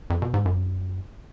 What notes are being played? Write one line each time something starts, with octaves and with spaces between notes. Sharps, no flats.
F2
B2
G#2
F#2